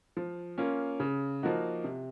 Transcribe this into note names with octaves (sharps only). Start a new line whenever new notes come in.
F3
A#3 C#4 F4
C#3
F3 A#3 D#4 F#4
C3